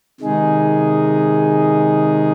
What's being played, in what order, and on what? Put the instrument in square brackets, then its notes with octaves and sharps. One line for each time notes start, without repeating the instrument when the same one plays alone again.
[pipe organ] C3 D#3 G#3 D#4 G#4